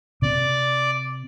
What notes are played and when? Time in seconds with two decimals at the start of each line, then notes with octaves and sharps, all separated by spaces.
0.22 C3 C4 D5